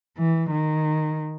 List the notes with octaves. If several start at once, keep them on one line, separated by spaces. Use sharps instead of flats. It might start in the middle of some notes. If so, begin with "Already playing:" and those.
E3
D#3